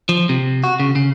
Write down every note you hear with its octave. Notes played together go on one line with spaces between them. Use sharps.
F3
C3
F#4
C#3
C#3